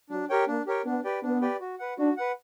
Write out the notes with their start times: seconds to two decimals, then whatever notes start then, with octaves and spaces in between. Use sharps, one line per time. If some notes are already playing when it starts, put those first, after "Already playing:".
0.10 F#3 D4
0.30 G4 A#4 C#5 G5
0.47 A#3 D4
0.67 G4 A#4 C#5 G5
0.85 B3 D4
1.04 G4 B4 D5 G5
1.23 B3 D4
1.41 G4 B4 D5 G5
1.60 F#4
1.79 B4 F#5
1.98 D4 F#4
2.17 B4 F#5